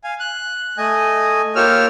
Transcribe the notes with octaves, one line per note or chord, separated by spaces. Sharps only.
F5 G#5
F#6
A3 D#5 G#5
A#3 F4 G4 C#5 E6 F6